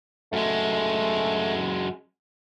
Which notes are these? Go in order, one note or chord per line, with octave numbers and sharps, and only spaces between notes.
F#2 G#3 A3